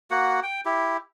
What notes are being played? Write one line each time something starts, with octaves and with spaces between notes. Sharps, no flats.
A#3 F#4 F#5
G5
E4 G4